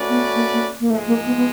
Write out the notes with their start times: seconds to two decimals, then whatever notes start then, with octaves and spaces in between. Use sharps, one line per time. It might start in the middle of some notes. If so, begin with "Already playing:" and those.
Already playing: A3 C#4 F#4 B4 D5
0.09 B3
0.35 A#3
0.53 A#3
0.80 A#3
0.90 G#2 F3 G#3 A3
1.07 A#3
1.26 B3
1.37 B3